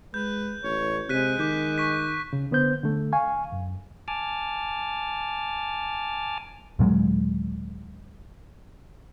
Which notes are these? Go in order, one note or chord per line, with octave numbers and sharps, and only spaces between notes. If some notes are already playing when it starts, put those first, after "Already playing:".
G#3 B4 G6
A1 C#5
C3 G#3 F#6 B6 D#7
D#3 D6 G6
C#6 B6
C#3
D3 B3 C5 G6
D3 A3
F5 G#5 C#6
F#2
G#5 A5 D6 F6
D#2 A#2 F#3 G#3